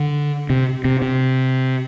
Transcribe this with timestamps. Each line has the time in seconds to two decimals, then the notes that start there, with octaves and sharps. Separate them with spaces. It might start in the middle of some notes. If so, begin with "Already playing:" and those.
Already playing: D3
0.50 C3
0.85 C3
1.02 C3